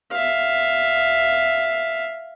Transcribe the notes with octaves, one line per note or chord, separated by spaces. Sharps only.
E5 F5